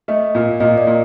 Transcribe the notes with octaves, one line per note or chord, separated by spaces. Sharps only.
A3 D#5
A#2
A#2 D#5
D5
A#2